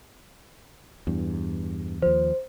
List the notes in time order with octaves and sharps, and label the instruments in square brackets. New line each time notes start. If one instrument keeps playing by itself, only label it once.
[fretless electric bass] E2 G2
[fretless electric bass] D#2 F3 [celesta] C5